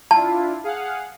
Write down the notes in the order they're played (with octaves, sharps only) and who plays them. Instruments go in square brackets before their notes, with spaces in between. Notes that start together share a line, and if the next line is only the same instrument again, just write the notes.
[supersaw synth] D4 E4 F4 [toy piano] A5
[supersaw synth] G#4 F5 F#5